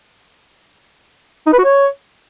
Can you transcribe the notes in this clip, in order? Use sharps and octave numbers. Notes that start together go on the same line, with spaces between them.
D#4
B4
F#4
C#5